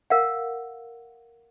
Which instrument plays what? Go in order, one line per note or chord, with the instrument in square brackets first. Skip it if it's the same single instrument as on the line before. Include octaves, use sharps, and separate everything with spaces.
[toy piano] A#4 F5 F#5